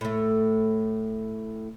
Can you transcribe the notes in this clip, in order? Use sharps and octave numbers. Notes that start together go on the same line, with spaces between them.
A2 A3